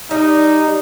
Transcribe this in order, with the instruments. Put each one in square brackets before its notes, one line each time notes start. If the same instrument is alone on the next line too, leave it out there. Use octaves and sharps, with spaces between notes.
[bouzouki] G3 [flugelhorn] D#4